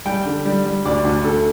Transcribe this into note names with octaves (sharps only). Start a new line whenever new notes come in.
G3 G5
D3
G3
G3
D2 D5
D2
D2 A4